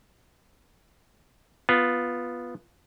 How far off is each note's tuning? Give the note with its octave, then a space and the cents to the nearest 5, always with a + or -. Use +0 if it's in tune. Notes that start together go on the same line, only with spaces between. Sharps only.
B3 -5 F4 +0